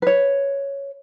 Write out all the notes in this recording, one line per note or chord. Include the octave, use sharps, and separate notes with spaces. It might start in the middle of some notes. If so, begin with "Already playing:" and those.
B4 C#5